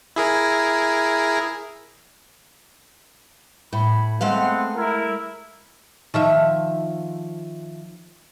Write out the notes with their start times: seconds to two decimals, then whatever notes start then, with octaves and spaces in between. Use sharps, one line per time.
0.16 E4 G#4 A#4
3.73 A2 B5
4.21 G#3 A3 B3 C4 F5 F#5
4.75 E4 A#4
6.14 D#3 F3 E5